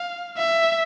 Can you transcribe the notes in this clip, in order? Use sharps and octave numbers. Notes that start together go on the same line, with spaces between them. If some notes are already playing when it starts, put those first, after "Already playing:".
Already playing: F5
E5